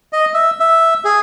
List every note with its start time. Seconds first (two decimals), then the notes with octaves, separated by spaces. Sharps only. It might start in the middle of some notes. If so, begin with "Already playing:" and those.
0.13 D#5
0.34 E5
0.60 E5
1.05 G#4